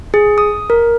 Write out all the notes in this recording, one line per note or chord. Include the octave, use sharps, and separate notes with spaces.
G#4
D#6
A#4